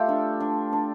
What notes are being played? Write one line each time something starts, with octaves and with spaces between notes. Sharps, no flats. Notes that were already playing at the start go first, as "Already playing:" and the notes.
Already playing: A3 F4 G4 A4
D4
D4
D4